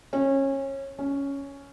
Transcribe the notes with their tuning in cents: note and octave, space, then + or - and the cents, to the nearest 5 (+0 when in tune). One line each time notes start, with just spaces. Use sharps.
C#4 -25
C#4 +5